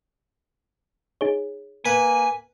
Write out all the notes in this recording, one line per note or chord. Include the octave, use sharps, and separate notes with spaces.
D#4 G#4 C#5
A#3 B4 G#5